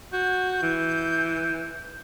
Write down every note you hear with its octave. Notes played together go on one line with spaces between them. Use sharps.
F#4 G6
E3